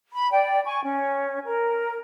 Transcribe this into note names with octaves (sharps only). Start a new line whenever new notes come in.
B5
D5 G5
G#5 C#6
C#4
A#4